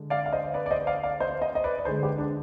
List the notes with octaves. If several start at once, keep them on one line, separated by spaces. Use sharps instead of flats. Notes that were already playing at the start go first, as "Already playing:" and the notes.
Already playing: D3 G#3
D5 F5
F5
C5 D#5
B4 D5
D5
C5 D#5
D5 F5
D5 F5
C5 D#5
C5 D#5
D#5
B4 D5
D5
D3 G#3 G#4 C5
G4 B4
D4